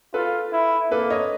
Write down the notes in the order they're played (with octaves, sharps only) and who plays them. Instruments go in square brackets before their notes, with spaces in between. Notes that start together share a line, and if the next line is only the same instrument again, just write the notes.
[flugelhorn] F4 [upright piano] A4 B4
[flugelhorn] E4
[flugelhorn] A#3 [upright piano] A4 B4
[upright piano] C#5 D#5